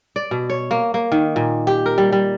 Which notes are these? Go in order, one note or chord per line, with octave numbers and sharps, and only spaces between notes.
D5
B2
C#5
A#3
A#3
D#3
A#2
G4
A#4
G3
G3